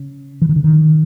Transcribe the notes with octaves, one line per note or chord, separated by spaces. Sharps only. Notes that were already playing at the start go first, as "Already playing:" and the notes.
Already playing: C#3
E3
D#3
D3
D#3